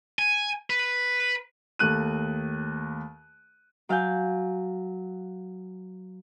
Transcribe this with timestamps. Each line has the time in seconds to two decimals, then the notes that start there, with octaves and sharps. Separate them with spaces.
0.19 G#5
0.70 B4
1.79 D#2 A3 F#6 D#7
3.89 F#3 F5 G#5 G6